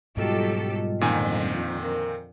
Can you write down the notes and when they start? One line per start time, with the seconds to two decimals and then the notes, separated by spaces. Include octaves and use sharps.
0.17 G#2 B2 F#3 G3 F4 G4 A4 D#5
1.01 F2 A#2 D3 D#3 G#5
1.82 A#4